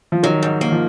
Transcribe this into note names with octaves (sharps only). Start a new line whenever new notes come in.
F3
D#3 F#3
G#2
A#3
F3